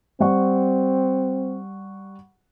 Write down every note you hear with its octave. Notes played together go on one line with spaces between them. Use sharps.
G3 C4 F#5 C#6